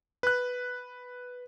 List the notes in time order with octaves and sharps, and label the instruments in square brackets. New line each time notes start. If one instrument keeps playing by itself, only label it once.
[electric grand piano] B4 F#6